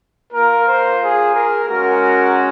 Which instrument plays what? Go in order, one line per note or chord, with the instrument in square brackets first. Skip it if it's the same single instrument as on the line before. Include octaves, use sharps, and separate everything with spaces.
[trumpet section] A#3 F4 A#4
C5
G#4
A#4
G#3 C#4 F#4 A#4